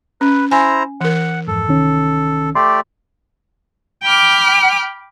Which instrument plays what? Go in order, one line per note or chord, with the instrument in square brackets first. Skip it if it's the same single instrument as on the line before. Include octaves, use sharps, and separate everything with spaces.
[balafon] C#4 [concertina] B4
[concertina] E4 C5 A#5 [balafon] G#5
[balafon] E3 A#4 [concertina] F#5
[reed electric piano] F2 G#2 [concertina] A4
[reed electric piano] C2 D#3 C#4
[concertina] A3 G4 D5 [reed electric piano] C6
[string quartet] G5 B5 D6 F6